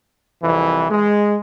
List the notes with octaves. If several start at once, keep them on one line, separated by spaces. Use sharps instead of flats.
C2 F2 E3
G#3